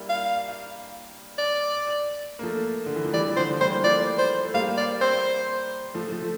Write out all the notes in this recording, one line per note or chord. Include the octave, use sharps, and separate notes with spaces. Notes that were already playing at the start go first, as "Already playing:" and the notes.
Already playing: G3 A#3 D4 E4
F5
D5
A#3
F3 A3
D3
E3
F3
E3 G3 D5
D3 F3 C5
F3
E3 G3 C5
A#3
F3 A3 D5
C5
A3
G3 A#3 F5
D5
C5
F3 A3
F3 A3
F3